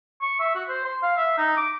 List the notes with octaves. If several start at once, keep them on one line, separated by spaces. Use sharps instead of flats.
C#6
E5
F#4
C5
C6
F5
E5
D#4
D6